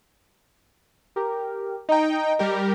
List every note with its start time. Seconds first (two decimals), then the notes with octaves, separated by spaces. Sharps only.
1.16 G4 A#4
1.89 D#4 D#5 G5 A#5
2.39 G3 G4 A#4